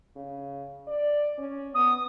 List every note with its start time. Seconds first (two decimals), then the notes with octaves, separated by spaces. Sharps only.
0.16 C#3
0.87 D5
1.38 C#4
1.74 B3 D#6